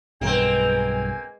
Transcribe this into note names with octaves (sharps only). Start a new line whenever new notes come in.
B1 G2 B2 G#3 A#3 C4 B4 G#5